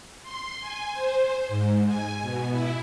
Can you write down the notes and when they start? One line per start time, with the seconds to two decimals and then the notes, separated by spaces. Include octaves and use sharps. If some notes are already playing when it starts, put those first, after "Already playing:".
0.22 C6
0.60 G#5
0.92 C5
1.48 G#2
1.87 G#5
2.22 B2
2.51 E4